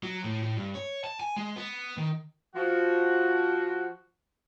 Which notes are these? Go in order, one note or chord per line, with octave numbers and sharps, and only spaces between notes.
F#3
A2
A2
G2
C#5
A5
G#5
G#3
B3
D#3
F3 F#4